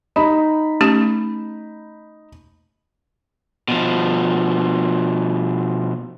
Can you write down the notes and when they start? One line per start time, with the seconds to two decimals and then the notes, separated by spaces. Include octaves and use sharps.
0.16 D#4 G4 B5
0.81 A3 C#4 G4
3.68 B2 F3